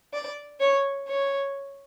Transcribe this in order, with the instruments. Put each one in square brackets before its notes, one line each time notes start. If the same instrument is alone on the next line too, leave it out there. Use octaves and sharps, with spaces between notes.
[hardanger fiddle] D5
C#5
C#5